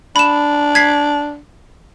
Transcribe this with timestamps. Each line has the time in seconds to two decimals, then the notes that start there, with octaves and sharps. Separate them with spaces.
0.16 D4 B5 E7
0.75 G#6 B6 C7